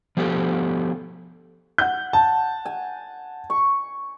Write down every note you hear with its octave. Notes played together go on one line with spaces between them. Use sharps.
F3 B3 G4 A4
F#5 G6
A5
G#5
C#6